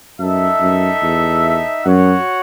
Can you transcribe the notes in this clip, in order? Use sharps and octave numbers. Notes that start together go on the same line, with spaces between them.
F#2 D#4 A4 E5
F#2
E2
F#2 F#4 C#5 F#5